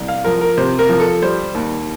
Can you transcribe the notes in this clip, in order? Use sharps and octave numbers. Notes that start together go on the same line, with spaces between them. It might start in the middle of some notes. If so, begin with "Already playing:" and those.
Already playing: C2
F5
F3 A#4
A#4
C3 C5
A#4
F3
A4
G3 C5
D#2